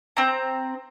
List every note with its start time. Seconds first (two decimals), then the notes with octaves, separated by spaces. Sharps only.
0.17 C4 A#5